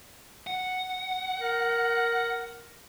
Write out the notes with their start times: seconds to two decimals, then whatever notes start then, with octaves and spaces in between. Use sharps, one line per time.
0.47 F#5
1.40 A#4